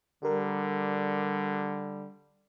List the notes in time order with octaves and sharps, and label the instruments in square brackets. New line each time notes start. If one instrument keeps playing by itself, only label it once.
[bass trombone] D3 [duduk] G3 [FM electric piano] G4 A#4